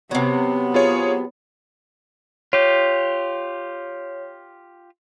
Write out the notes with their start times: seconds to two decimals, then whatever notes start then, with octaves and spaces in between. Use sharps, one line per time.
0.11 C3 F#3 B3
0.74 F4 G#4 C#5
2.53 F4 G4 C#5